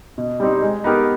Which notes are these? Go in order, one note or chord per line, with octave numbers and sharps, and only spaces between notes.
B2
G3 C4 D#4
G#3
B3 D#4 G4 A#4